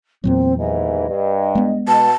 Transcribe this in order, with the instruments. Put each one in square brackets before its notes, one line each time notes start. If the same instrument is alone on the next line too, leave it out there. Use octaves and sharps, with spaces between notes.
[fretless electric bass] E2 A#2 F#3 [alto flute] C4
[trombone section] D#2 G#2 E3 [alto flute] D#5
[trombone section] G2
[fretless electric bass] G#3 B3
[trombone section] B2 [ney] A5